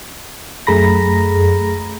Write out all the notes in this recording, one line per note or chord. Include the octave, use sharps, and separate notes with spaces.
F#2 A3 G#4 A#5 B5 A#6